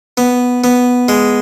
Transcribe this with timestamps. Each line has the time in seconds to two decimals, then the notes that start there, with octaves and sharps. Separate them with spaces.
0.17 B3
0.64 B3
1.08 G#3